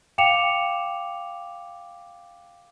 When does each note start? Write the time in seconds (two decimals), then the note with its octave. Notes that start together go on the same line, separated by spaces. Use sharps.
0.18 F5 G5 D6 C#7 E7 F7